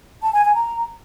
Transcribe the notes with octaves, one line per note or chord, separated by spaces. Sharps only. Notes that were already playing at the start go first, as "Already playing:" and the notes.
A5
G#5
G#5
A#5